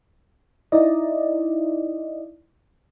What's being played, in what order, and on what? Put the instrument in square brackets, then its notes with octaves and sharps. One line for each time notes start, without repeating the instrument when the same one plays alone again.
[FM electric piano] D#4 E4 D5 D#5